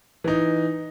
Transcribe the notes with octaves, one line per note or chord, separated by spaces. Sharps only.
E3 D#4